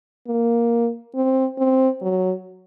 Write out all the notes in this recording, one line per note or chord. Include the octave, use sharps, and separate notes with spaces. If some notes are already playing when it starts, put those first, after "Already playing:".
A#3
C4
C4
F#3